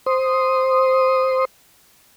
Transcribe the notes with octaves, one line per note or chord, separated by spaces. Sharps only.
C5 C6 D#6